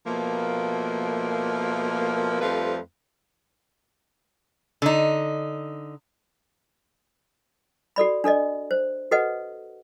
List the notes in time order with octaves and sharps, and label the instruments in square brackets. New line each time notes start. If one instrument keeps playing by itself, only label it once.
[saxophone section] B2 F3 A3 A#3
F2 F3 G3 A3 B4 F5
[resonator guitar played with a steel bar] D3 D#4
[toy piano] F#4 A4 D5 B5
D4 A4 D5 D#5
C5
F#4 A4 B4 D#5 F#5